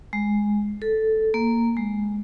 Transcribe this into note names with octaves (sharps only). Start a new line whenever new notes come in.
G#3
A4
A#3
G#3